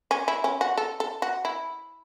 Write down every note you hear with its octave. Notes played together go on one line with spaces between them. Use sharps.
C#4
E4
C#4
F#4
A4
A4
F#4
E4